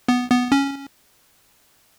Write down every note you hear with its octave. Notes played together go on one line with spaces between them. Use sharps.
B3
B3
C#4